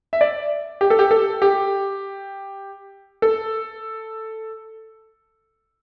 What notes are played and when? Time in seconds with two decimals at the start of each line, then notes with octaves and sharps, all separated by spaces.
0.13 E5
0.21 D5
0.81 G4
0.90 A4
0.99 G4
1.11 A4
1.42 G4
3.22 A4